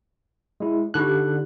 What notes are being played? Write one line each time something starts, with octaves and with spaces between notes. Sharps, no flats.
G#3 E4
D3 D#4 F4 G4 F#6